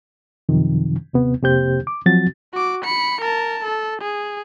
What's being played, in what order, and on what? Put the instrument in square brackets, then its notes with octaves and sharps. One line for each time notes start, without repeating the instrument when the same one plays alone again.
[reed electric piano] F#2 C3 D#3 F3
D#2 C3 B3
F2 C3 A#3 G4 C5 G6
D6
F3 F#3 C4 F#4 A6
[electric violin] F#4 D6
B5 C#7
A#4 A5
A4
G#4